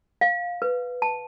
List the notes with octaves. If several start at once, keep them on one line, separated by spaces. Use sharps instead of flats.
F5
B4
A5